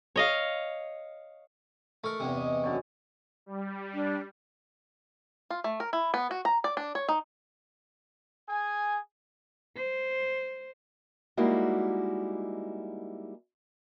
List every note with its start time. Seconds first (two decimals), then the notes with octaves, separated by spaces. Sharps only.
0.16 C#5 D#5 F5
2.04 A3 A#4 C#6
2.20 E2 G2 C3
2.37 D#5
2.64 F#2 D3 C#5
3.46 G3
3.94 D4
5.50 F4
5.64 A3
5.80 A#4
5.93 E4
6.14 B3
6.31 F#4
6.45 A#5
6.64 D5
6.77 D4
6.95 C#5
7.09 D#4
8.48 G#4 G#5
9.76 C5
11.37 G3 G#3 A#3 D#4 E4 F#4